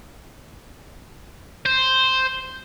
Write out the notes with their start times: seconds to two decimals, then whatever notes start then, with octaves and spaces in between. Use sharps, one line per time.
1.66 C5